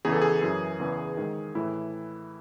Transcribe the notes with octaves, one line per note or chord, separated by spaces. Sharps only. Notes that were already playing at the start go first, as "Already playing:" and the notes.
E2 C#3 E3 G#4
A4
G#4
F#2 E3
E2 C#3 E3
G#2 D#3
A2 E3 E4